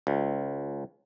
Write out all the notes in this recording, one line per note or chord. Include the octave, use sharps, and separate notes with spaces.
C#2